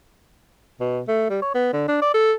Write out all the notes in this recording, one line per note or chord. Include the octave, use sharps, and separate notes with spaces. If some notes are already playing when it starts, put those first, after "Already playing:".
B2
A3
G3
C#5
B3
D3
D4
D5
A4